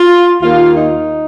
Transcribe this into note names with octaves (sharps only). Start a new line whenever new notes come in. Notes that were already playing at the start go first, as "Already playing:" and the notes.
Already playing: F4
D#2 D#3 A#3 F4
D#4